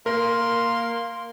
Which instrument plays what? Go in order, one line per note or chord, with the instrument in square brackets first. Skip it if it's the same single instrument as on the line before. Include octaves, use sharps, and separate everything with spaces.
[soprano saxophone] A#3 [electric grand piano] A#4 [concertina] C6